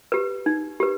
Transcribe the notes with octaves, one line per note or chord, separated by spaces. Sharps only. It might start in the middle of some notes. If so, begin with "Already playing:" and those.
G4 B4
D#4
G4 B4